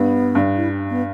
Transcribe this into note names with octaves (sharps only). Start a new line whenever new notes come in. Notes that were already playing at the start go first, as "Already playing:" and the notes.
Already playing: G2 B3
G2
E4
B3